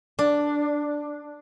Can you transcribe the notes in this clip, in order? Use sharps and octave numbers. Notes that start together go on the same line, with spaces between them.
D4